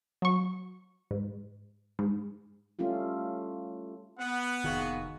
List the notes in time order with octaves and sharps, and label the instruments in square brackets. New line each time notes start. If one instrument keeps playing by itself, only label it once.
[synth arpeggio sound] F#3 C#6
G#2
G#2
[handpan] G3 A3 C#4 F4 G4
[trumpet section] B3 [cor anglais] F#5
[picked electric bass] F1 C2 D#3 [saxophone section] A#3 F#4 G#4